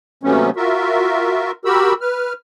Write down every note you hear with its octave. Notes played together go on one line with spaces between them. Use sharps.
D#2 C3 F#3 A3 B3 C#4
F4 F#4 A#4 E5
F#4 G4 A#4 B5 E6
B4 F6